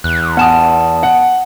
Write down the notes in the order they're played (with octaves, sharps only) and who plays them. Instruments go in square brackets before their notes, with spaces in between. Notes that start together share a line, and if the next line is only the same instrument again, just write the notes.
[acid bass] E2 [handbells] F#6
[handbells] B3 A5 D#6 [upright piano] F#5 E7
[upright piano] F#5